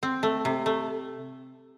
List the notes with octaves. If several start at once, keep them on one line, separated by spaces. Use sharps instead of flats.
C4
A3
C3
A3